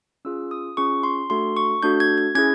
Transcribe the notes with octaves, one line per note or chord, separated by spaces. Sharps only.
C#4 F4 G#4 E6
D#6
C#4 F4 G#4 C#6
C6
A3 D4 F#4 A4 C6
C#6
A3 D4 F#4 A4 G6
G#6
G#6
C#4 E4 G#4 G#6